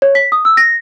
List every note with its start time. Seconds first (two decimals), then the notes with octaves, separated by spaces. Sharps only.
0.02 C#5
0.15 B6
0.32 D#6
0.45 E6
0.57 A#6